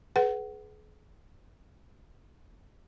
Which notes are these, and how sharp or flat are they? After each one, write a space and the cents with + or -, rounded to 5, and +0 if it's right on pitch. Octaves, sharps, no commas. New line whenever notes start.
G#4 +35 B4 +0 F#5 +20